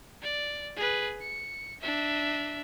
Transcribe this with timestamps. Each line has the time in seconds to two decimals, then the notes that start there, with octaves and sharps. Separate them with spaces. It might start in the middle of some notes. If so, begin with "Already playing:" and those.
0.22 D5
0.76 G#4 B4
1.21 C#7
1.81 D4 E5